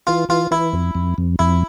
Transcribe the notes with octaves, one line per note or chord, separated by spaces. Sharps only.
E3 F4
E3 F4
E3 E4
F2
F2
F2
F2 E4